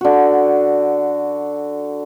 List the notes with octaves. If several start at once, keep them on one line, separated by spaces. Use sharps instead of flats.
D3 F#4